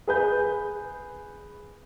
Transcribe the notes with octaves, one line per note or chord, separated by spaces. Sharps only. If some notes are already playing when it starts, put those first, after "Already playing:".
G#4 B4 G6